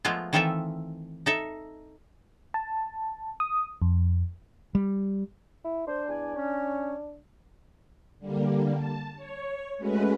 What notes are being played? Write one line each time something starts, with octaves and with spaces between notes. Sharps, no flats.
F3 G#3 A3 B3 F4
D#3 E3 C4 F4 A4 E5
D#4 A4 E5
A5
D#6
F2
G3
E4
D4 C5
E2 D5 G#5
C#4
D3 G3 A#3
A5
C#5
G#3 A3 C#4 F#4 B4